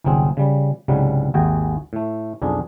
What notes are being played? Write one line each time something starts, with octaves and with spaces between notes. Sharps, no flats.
G1 C2 F#3 C4 G#4
C#3 G3
C2 G#2 C#3 F#3 G3
G#1 D#2 F#4 G#4 G5 G#5
A2 A3
B1 F2 D4 G#4